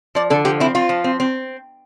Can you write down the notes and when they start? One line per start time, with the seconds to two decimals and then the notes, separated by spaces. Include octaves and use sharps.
0.15 F3 D5
0.30 D3 A4
0.45 F3 G4
0.60 C4 E4
0.75 C4 F4
0.89 F3
1.04 C4
1.20 C4